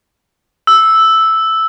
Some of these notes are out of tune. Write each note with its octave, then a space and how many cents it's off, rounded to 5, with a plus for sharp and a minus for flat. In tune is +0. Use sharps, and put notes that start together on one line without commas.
E6 -5